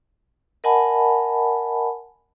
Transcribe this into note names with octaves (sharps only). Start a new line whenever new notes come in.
A#4 D#5 F#5 G#5 A5 B5